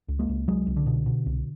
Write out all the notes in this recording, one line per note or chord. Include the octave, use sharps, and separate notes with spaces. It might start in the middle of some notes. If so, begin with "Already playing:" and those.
C#2
G#3 A#3
C#2
C2 F#3 G#3
C2
D3
B2
B2
C2